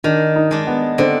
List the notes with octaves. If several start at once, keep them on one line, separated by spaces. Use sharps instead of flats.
D#3 D4
D#4
G#3 D4
B3
D3 C4